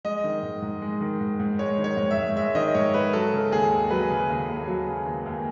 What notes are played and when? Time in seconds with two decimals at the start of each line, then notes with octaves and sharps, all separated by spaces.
0.05 G#3 D#5
0.24 D#3
0.43 G#2
0.62 G#2
0.82 G#3
1.01 D#3
1.21 G#2
1.39 G#2
1.59 G#3 C#5
1.78 D#3
1.84 C#5
1.97 G#2
2.11 E5
2.17 G#2
2.36 G#3 E5
2.55 D#3 D#5
2.75 G#2 C#5
2.94 G#2 B4
3.13 F#3 A4
3.33 C#3
3.51 D#2 G#4
3.71 D#2
3.90 F#3 B4
4.10 C#3
4.29 D#2
4.48 D#2
4.68 F#3
4.87 C#3
5.06 D#2
5.26 D#2